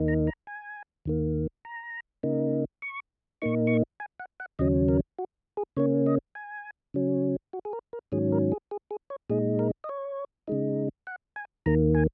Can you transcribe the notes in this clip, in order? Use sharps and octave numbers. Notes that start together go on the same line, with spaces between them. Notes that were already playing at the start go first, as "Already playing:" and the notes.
Already playing: D#2 D#3 A#3 D#4
A#5
A#5
G#5
D#2 D#3 A#3
A#5
C#3 A#3 D#4
C#6
A#2 A#3 D#4 C#6
C#6
G#5
F#5
F#5
D#2 C#3 F#3 C#4 D#5
A#4
F#4
G#4
C#3 A#3 C#4 C#5
D#5
G#5
C#3 F#3 C#4
F#4
G#4
A#4
A#4
G#2 D#3 F#3 C#4 G#4
A#4
G#4
G#4
G#4
C#5
A#2 G#3 D#4 G#4
A#4
D#5
C#5
C#3 G#3 D#4
F#5
G#5
D#2 D#3 A#3 A#5
G#5